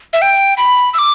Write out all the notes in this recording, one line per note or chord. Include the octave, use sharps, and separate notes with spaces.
E5
G5
B5
E6
D6